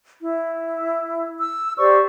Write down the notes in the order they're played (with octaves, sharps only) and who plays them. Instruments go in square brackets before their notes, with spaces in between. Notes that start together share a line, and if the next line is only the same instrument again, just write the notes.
[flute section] E4
E6
G4 C5 D5 C#6